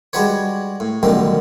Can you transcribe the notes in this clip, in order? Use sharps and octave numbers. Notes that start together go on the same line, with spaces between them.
G3 G#3 D4 F#4 B4 C#5
A2
A1 F#2 B2 D3 D#3 G3